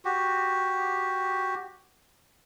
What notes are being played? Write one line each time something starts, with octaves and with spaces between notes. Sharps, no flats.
F#4 G4